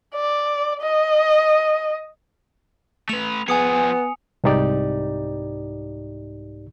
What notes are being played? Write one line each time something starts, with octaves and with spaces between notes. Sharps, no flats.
D5
D#5
A3 B4 F7
F3 B3 G#4 G#5 D#6 C#7
C2 G#2 D#4 G4 D5